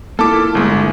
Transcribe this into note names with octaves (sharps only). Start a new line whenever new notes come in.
A#3 E4 F4 A4 A5 D6
G1 G#3